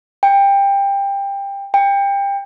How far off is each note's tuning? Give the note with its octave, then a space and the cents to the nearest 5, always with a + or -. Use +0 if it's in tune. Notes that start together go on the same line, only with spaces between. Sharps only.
G5 +20
G5 +25